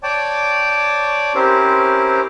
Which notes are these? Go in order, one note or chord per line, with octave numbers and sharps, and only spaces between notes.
C#5 D5 G5 A5 D6
C4 C#4 E4 G4 A#4 C5